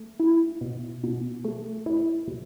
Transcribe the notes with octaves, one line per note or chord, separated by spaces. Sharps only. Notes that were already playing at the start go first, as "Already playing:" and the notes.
Already playing: A3
E4
B2
B2
A3
E4
B2